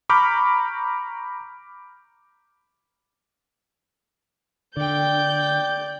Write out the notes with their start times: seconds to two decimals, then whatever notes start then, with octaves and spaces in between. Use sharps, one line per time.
0.09 A#5 B5 C#6 D6 F6 G6
4.77 D3 D5 G5 G6